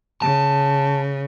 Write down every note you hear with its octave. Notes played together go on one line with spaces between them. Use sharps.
C#3 A5